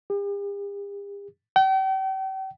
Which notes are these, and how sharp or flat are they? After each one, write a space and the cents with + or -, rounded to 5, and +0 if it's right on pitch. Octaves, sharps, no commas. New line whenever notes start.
G4 +45
G5 -40